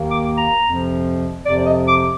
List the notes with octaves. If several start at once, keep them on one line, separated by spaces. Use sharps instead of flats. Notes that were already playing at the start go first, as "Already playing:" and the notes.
Already playing: D#2 D#3 A#3
D6
A#5
F2 C3 F3
F2 C3 F3 D5
D#5
D6